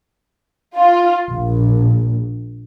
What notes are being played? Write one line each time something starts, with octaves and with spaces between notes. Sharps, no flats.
F4
A#1